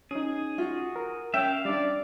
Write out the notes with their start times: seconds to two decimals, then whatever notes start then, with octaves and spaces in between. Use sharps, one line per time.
0.11 C#4 D#4 G#4
0.58 F4 F#4
0.96 A#4
1.34 C#4 E5 F5 G5
1.65 G3 D4 D5